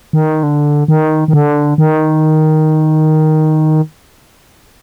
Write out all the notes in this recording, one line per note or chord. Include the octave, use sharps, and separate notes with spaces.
D#3
D3
D#3
D#3
D3
D#3